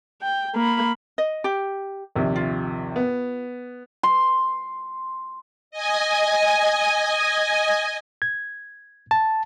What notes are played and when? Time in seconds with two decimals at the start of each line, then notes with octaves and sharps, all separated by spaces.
0.22 G5
0.55 A#3 B5
1.18 D#5
1.44 G4
2.16 A#1 D#2 C3
2.36 F4
2.96 B3
4.03 C6
5.71 D#5 G#5
8.22 G#6
9.11 A5